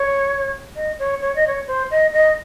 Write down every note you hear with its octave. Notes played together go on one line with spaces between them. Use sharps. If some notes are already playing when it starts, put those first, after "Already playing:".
Already playing: C#5
D#5
C#5
C#5
D#5
C#5
C5
D#5
D#5